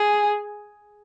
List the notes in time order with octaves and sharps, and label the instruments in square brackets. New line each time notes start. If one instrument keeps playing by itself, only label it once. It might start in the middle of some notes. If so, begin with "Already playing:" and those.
Already playing: [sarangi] G#4